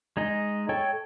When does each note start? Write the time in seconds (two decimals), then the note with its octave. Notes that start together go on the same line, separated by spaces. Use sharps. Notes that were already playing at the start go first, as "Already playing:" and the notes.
0.17 G#3 D#4 D#5
0.69 A4 C#5 G5